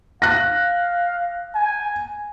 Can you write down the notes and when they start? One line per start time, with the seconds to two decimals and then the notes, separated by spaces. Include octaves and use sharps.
0.22 F5 F#6 A#6
1.55 G#5